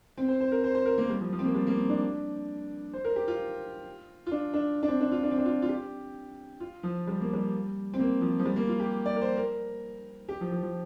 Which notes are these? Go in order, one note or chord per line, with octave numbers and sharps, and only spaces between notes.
C4
C5
C5
A#4
C5
C5
A#4
A#3
G3
F3
F3
C4
A#3
G3
A#3
C4
D4
C5
A#4
G4
F4
F4
D4
D4
D4
C4
D4
F4
D4
C4
D4
F4
F4
G4
F4
F3
G3
A#3
G3
C4
A#3
F3
F3
G3
A#3
F4
G4
D5
A#4
C5
A#4
G4
F3
F3
F3